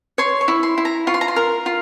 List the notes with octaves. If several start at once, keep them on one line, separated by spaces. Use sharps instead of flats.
C#5 C6
C#6
E4
C6
E4
A#5
F4 C#6
C6
A#5
C6
A#4
F4